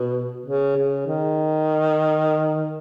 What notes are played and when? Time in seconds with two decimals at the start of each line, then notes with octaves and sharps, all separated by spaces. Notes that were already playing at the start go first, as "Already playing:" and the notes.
Already playing: B2
0.46 C#3
0.76 C#3
1.07 D#3